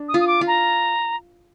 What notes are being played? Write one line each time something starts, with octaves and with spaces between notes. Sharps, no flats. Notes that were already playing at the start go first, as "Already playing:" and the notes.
Already playing: D4
D#6
F4
D#6
D6
F4
A#5